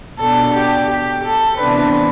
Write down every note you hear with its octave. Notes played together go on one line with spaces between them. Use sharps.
B2 B3 D4 A4
G4
G4
A4
C3 E3 B3 D4 B4